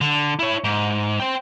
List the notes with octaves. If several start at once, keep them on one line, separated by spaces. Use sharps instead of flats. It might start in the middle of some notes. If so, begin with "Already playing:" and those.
D3
E4 C#5
G#2
C5 G5